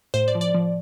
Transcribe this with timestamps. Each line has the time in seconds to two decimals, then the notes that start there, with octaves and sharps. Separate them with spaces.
0.14 A2 C5
0.28 D5
0.35 F3
0.41 D5
0.55 F3